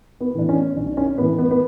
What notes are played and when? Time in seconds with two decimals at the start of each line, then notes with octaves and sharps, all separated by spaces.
0.20 B3
0.35 A2 E3 D4
0.49 C#4
0.76 B1 D4
0.97 C#4
1.18 A2 E3 B3
1.39 B3
1.51 B3